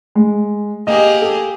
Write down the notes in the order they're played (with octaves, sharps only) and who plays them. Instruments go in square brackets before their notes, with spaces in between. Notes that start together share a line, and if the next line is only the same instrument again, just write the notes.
[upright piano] G#3
[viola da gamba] A#3 G4 G#4 [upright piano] D#5
[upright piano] A4